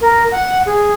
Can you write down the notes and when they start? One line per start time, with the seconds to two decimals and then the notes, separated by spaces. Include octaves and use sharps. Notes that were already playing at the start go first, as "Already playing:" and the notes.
0.01 A#4
0.31 F#5
0.66 G#4